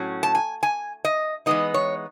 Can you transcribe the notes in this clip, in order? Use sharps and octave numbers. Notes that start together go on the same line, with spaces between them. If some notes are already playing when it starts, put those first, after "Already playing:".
Already playing: A2 F#3 C#4
A5
G#5
G#5
D#5
E3 G#3 B3 D#4 D#5
C#5